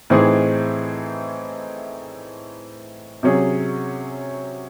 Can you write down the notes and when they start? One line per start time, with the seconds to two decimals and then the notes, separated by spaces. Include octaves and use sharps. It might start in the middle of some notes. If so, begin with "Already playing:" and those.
0.10 A2 E3 C4 D#4 G#4
3.23 C3 F#3 C#4 G#4